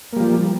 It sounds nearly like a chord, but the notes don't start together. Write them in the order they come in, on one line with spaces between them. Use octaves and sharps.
A#3 G3 F3